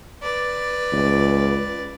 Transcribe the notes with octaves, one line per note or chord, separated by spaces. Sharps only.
B4 D5
C#2